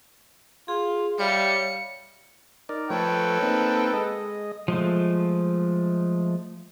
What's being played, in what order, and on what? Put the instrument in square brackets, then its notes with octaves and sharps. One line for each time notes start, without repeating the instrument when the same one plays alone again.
[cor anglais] F4 [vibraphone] G#4
[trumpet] G3 [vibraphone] C#5 E5 [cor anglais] F5 [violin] C#7
[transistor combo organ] D#4 A#4 D5
[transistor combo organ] F3 A3 C#5 [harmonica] A4 B4 G5
[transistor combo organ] A#3 C4 D#4
G#3 D#5
[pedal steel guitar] F3 G#3 A3